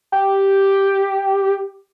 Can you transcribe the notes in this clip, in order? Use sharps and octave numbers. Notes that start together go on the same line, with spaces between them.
G4